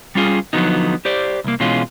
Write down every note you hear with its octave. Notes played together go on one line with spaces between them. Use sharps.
G3 C#4 F4 G#4
D3 F3 F#3 B3 D#4
G4 C5 D5
C2 A#3
B2 E3 G#3 C#4 F4